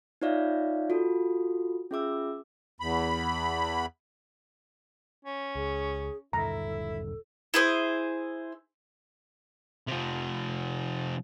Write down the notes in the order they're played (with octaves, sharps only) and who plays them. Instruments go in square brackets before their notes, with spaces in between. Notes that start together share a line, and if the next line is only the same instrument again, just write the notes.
[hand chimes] D#4 F4 C#5 D5 E5 F5
F4 F#4 A4
C#4 F4 G#4 E5 D6 E6
[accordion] E2 B5
[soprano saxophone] C#4
[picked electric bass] C#2 [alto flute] G#4
[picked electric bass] D#1 G2 D3 [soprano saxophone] E4 [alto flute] A4 [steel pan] A#5
[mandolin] E4 G#4 C5
[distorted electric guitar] C3 F3